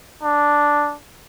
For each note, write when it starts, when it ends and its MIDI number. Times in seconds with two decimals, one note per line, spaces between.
0.23 0.95 62